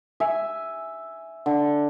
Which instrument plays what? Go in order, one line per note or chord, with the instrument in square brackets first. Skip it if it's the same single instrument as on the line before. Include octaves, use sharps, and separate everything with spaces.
[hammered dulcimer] E5 G#5
D3